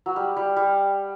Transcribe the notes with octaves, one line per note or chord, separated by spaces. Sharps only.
F#3
G3
G3
G3